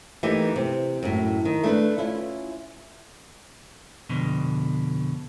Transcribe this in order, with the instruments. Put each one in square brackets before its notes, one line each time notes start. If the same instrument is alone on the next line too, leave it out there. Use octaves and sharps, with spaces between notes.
[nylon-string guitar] E3 A3 A#3 D#4 G4
C3
F#2 A2
D#3
A3 D4 E4 B4
C#4 E4 F4
[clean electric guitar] F2 B2 D3